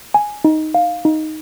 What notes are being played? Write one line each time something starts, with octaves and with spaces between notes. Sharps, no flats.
G#5
D#4
F5
D#4